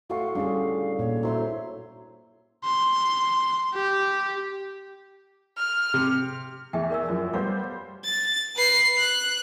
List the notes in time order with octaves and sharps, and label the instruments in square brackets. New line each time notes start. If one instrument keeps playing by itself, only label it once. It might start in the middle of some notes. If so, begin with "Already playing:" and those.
[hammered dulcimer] A2 C6 C#6 [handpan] F#4 [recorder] F5
[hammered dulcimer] D3 [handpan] G3 C#4 G#4 [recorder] F5
[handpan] A#2 [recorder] C#5
[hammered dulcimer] F#3 C6 [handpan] E4 C5 E5
[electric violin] C6
G4
[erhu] F6
[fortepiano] C3
[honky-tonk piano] E2 [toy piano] G#4 E5 G5
[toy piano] A#4 D5 E6
[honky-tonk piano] F#2 F3 [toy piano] D5
[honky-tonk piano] G3 B3 C5 [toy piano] D5 F5 F#5
[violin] A6
B4 C7
F#6